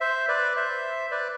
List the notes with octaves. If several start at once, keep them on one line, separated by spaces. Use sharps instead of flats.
C5 E5
B4 D5
C5 E5
B4 D5